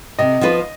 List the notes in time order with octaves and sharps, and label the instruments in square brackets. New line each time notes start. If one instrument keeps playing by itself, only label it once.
[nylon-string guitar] C3 [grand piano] D#5
[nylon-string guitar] F3 B3 F4 B4